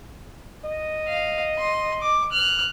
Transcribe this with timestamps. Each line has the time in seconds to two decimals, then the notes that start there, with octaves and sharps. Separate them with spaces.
0.65 D#5
1.07 F5
1.58 C6
2.02 D6
2.32 F6 F#6